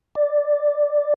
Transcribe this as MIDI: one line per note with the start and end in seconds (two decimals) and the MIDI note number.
0.15 1.14 74